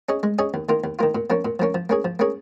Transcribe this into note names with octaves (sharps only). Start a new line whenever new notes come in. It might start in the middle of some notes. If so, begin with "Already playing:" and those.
C#4 G#4 D#5
G#3
C#4 G#4 D#5
D#2
D#3 A#3 F4
D#2
D#3 A#3 F4
A#2
F3 A#3 C#4
A#2
F3 A#3 C#4
F3
A#3 C#4 G#4
F3
A#3 C#4 G#4